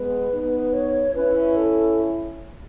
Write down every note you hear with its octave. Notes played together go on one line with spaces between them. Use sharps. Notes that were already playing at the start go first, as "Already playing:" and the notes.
Already playing: G#3 B3 B4
B3 D#4
C#5
C#4 E4 B4
A4